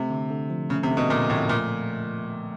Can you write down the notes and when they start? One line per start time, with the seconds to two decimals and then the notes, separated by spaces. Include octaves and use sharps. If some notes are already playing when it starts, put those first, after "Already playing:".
Already playing: C3 A3
0.10 D3
0.30 D3
0.50 F3
0.70 C#3 A3
0.83 C3
0.90 D3
0.97 B2
1.10 A#2 D3
1.29 A2 F3
1.49 A#2 A3